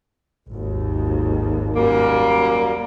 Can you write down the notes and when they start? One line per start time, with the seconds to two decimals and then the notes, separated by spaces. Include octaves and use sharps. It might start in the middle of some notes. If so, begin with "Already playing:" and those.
0.48 G#1 D#2
1.75 F#2 G3 A#3